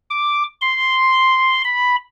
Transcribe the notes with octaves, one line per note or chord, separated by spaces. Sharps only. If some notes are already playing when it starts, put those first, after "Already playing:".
D6
C6
B5